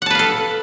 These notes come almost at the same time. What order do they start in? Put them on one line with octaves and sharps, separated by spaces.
F#5 A5 B4 F5 A4